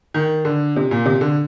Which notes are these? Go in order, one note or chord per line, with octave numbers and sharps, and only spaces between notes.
D#3
D3
C3
A#2
C3
D3